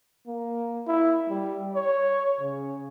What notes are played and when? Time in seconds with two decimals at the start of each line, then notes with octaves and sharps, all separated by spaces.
0.27 A#3
0.87 E4
1.29 G3
1.75 C#5
2.40 C#3